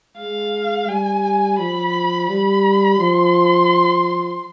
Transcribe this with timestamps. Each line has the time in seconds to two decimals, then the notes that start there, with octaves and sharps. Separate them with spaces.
0.17 G#3 F5
0.88 G3 G#5
1.58 F3 B5
2.29 G3 B5
2.99 F3 C6